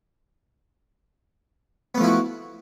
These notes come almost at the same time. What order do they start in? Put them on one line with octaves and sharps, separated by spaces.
B3 A3 F3 E4 F#4